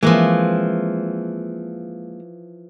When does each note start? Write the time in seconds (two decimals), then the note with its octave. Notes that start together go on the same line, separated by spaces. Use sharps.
0.03 E3 F3 G#3 A#3 C4